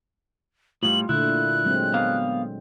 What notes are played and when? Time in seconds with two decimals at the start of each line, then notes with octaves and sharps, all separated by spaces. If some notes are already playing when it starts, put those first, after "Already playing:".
0.83 A2 G3 F4 F#7
1.09 A#2 D3 A3 E4 F#6
1.64 F#3 G#3 C4
1.94 B3 F5